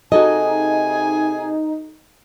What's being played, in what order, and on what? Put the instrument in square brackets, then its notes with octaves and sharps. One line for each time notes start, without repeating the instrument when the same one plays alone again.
[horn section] C3 G#4 G#5 [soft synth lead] D#4 [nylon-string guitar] F#4 A4 D#5